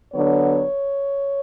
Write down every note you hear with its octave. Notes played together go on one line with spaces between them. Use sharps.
D3 F#3 B3 D4 C#5